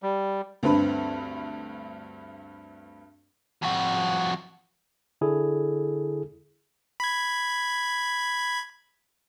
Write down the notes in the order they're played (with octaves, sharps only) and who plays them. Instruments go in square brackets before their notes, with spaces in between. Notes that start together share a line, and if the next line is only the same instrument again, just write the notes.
[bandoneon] G3
[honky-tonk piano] D2 G2 C4 B4 B5
[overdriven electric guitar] F2 F#4
[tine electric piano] D3 E4 G#4 A4
[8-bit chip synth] B5 G#6